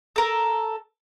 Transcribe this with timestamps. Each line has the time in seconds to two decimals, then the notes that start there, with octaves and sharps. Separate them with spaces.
0.16 A4 A#4